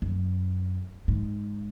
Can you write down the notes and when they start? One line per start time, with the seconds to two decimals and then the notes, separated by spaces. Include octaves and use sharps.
0.02 F#2
1.08 G#2